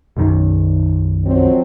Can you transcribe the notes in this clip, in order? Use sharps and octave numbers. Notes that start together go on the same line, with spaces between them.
B1 F#2 D#3
F2 F#3 C4